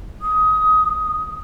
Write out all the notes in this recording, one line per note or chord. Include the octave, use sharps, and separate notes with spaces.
D#6